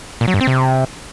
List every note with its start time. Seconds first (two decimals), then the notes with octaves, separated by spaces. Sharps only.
0.21 A#2
0.28 F#3
0.34 G2
0.41 C4
0.47 C3